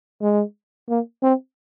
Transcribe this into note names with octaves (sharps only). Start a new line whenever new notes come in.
G#3
A#3
C4